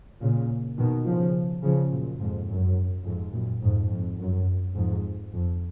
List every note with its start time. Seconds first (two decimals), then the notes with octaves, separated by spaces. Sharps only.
0.21 A#2 C#3
0.78 B2 D#3
1.06 C#3 F3
1.63 C#3 F3
1.92 F#2 A#2
2.20 F2 G#2
2.49 F#2
3.05 F2 G#2
3.33 F#2 A#2
3.62 F2 G#2
3.90 F2
4.19 F#2
4.75 F2 G#2
5.33 F2